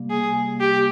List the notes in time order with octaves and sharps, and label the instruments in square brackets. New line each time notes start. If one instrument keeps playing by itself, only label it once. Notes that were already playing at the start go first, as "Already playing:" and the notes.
Already playing: [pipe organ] C3 G3 A#3
[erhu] G#4
G4